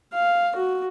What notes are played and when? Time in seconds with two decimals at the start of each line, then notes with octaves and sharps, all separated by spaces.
0.13 F5
0.56 F#4